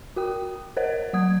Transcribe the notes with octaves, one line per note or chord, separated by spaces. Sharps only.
F#4 A#4 G5 D#6
A#4 C5 C#5 D#5 F#5
F#3 F#5 D#6 G#6